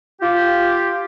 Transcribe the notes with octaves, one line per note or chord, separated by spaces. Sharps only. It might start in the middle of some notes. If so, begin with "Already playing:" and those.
F4 G4